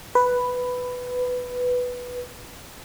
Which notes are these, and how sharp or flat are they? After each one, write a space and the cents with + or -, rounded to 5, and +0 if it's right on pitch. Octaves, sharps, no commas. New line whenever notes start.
B4 +5